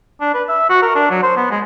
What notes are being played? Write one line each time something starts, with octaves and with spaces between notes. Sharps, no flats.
D4
B4
E5
F#4
A#4
D4
F#3
C5
B3
G#3